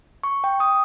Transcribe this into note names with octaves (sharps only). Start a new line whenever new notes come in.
C#6
G5
D#6